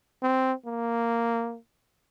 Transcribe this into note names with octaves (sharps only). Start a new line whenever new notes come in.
C4
A#3